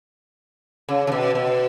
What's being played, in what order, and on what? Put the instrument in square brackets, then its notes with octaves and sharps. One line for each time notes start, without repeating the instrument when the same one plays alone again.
[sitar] C#3
C#3
B2
B2